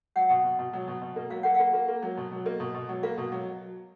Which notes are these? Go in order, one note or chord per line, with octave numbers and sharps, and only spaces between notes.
F#3 F#5
B2
B2
B2
F#3
B2
B2
A#3
F#3 F5
A#3 F#5
A#3 F5
A#3
A#3
F#3
B2
F#3
A#3 D#5
B2
B2
F#3
A#3 F5
B2
F#3